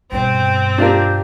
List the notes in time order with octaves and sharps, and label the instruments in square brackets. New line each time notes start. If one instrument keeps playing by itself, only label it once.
[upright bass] G2 B2 [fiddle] C4 [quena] G5
[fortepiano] D4 F4 A#4 [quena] G4